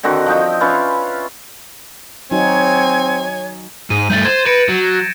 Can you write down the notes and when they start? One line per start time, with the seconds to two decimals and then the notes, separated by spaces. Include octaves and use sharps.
0.03 D3 D#3 C4 F#4
0.26 F3 D#4 G5
0.61 C#4 E4 F4 B4
2.31 F#3 C4 D#4 F#4 C#5 G#5
3.90 G#2 D#7
4.10 G2 A3 G6 A6
4.25 C5 G#6 E7
4.46 B4 A#6 C#7 D7
4.69 F#3